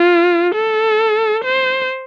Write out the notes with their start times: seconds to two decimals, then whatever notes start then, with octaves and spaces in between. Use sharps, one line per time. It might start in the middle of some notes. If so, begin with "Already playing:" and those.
Already playing: F4
0.55 A4
1.45 C5